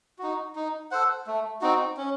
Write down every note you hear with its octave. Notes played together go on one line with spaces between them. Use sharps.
D#4 F#4
D#4
A4 C5 F#5
A3
C4 D#4 F#4
C#4